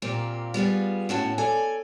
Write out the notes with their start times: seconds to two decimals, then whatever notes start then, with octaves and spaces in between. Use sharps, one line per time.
0.02 A#2 A#3 C4 G4
0.54 G3 B3 F4 G#4
1.09 A2 C#4 F#4 A5
1.38 A4 C#5 D5 G#5